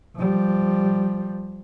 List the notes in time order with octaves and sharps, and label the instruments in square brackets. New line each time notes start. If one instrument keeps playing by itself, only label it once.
[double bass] F3 G3